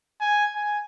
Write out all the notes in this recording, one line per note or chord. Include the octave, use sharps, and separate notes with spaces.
G#5
G#5